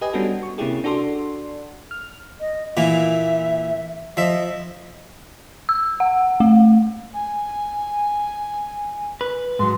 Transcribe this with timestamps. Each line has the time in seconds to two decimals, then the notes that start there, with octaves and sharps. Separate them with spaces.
0.01 G4 B4 D#5 G#5
0.13 G3 B3 C#4 D4 F#4 A4
0.43 C#6
0.58 C3 A#3 C#4 E4 G4 G#4
0.84 D4 F#4 A4 D5 C6
1.91 F6
2.40 D#5
2.77 A#2 E3 A#3 E5
4.17 F3 D#5 E5
5.69 E6
6.00 F#5
6.40 A3
7.13 G#5
9.21 B4
9.59 G#2 F#3 C6